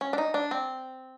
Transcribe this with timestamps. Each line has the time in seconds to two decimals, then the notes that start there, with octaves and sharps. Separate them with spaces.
0.01 C#4
0.13 D4
0.18 D#4
0.34 D4
0.51 C4